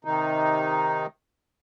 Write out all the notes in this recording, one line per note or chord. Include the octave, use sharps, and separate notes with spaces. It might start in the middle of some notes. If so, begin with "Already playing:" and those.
C3 D#3 D#4